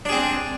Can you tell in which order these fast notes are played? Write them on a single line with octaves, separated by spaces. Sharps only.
D4 G#4 C4